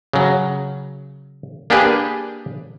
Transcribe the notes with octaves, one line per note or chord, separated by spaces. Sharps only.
C#3 F#3
A#3 D4 G4 G#4 B4